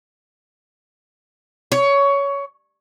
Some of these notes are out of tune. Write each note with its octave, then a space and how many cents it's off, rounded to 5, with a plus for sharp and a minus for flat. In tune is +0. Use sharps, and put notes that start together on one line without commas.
C#5 +15